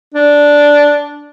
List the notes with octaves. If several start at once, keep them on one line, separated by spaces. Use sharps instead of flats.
D4